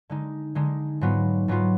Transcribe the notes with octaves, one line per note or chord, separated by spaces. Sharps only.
D3 G#3 D#4
D3 G#3 D#4
G#2 F#3 B3 F4
G#2 F#3 B3 F4